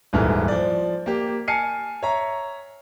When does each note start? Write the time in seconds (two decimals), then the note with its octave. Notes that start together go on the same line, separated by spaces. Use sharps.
0.13 D#1 G#2 E3 A4 F6
0.48 F3 D5
1.06 A#3 G4
1.48 G#5 A5 F6 C7 C#7 D#7
2.03 C#5 E5 A#5